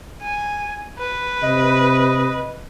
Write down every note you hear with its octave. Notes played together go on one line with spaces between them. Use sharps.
G#5
B4
C3 D#5